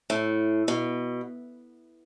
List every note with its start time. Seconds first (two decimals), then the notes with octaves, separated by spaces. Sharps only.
0.10 A2
0.68 B2